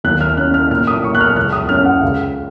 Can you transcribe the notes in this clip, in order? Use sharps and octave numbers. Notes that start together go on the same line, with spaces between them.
D#2 F#6
F6
C#4 F#6
F6
A#2 F6
D#6
A#2 C#6
F#6
F6
C#2 F#6
D#6
C#4 F6
F#5
C#2 F5